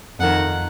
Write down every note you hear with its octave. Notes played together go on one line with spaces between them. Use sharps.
F2 D#3 F#5